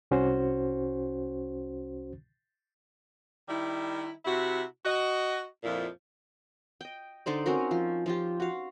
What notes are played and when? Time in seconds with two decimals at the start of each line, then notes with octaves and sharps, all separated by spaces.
0.11 C2 C#4 F#4 C5
3.49 D#3 G3 E4
4.25 C3 E4 F#4
4.86 F#4 D#5
5.64 F2 A#2 F3 E4
6.81 D#5 G5
7.26 D3 D#4 C5 D5
7.46 C4 C#4 F#4 A#4
7.71 F3
8.06 F3 F4 G4
8.40 F#4 F5